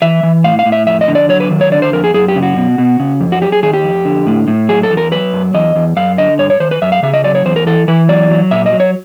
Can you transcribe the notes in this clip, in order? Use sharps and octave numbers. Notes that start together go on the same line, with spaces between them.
E3 E5
E3
A2 F5
F5
A2
E5
F2 E5
D#5
D3
D5
F#3 C#5
B4
D#3
C#5
D3 D5
C5
F2 A#4
G#4
F#2 G#4
G4
C#3
F#4
B2
B2
C#3
F2
F#4
F#3 G4
G#4
D#3 G#4
G4
F2
D3
A2
A2
F#3 G#4
A4
E2
A#4
F#3 B4
F#2
E2 D#5
E2
F#2 F5
D3 D#5
G2 C#5
C#5
D#3 C5
B4
F#2 E5
F5
C#3 E5
D#5
F#3 D5
C#5
E2 C5
A#4
E3 A4
E3 B4
F#3 D5
F#3
A#2 E5
D#5
F#3
C#5